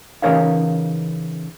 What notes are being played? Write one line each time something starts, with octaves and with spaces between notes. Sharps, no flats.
C#3 E3 D#4 A#4 C#5 F5